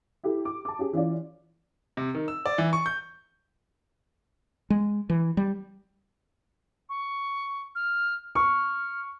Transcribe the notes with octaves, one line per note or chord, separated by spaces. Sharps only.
E4 G4 A4
D6
A5 D6
C#4 G4 G#4
E3 C#4 F4 D5
C3
D#3
E6
D5
E3
C#6
G6
G#3
E3
G3
C#6
F6
C#6 F6